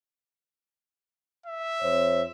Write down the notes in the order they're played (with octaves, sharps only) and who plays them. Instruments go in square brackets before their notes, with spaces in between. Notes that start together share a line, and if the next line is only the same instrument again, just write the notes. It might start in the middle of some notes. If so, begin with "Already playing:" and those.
[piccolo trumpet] E5
[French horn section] F2 C5 C#5